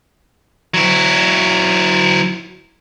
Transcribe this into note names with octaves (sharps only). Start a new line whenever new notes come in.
F#3 E4